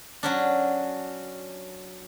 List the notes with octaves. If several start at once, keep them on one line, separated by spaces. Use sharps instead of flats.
F#3 C#4 D4